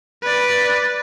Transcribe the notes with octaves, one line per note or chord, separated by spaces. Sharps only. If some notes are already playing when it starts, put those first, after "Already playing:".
B4 D5